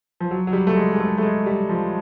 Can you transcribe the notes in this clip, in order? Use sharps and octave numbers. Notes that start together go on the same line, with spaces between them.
F3
F#3
F#3
G3
A3
G#3
G#3
A3
A3
G#3
G3
F3